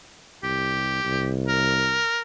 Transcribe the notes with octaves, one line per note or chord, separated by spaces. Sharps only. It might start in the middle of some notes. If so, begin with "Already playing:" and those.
C2 G4
C2
A#4